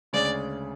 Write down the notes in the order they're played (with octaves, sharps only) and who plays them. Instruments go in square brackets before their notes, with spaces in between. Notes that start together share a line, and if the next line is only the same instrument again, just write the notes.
[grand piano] D2 C#3 G#3 C#4 G#4 [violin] D5